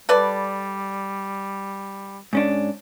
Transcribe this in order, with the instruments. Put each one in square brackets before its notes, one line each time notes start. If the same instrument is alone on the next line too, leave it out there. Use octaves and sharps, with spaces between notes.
[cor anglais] G3 [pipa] A4 B4 D5
[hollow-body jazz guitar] G#2 C#4 D4